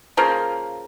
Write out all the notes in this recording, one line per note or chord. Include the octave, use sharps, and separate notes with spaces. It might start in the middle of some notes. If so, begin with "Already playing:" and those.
C#3 F3 A#3